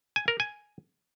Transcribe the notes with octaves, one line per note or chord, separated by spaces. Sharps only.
G#5
A#4
G#5